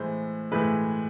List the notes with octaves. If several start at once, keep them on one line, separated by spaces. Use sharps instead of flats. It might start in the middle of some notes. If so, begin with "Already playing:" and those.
Already playing: A2 E3 G#3 C5
A2 E3 G#3 B4